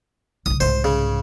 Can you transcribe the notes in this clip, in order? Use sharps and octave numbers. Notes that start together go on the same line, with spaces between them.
B1 C#3 D#6
C2 G#2 C5
C#3